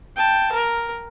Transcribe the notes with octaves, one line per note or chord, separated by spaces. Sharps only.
G5 A5
A#4